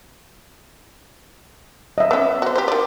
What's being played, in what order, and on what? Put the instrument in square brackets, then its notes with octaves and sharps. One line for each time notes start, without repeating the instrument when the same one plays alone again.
[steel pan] D#5 E5
[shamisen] B3 C#4 [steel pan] E6
[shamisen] F#4 C5
G4 C5
D#3 D5